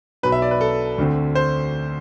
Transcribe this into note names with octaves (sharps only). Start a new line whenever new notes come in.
B1 B2 F#3 B4
E5
D5
B4
A4
D2 D3 A3 C4
C5